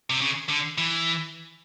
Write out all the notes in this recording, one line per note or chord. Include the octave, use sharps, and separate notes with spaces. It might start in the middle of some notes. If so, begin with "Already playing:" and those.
C3
C#3
D3
E3